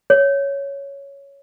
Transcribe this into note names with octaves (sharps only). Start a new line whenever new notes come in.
C#5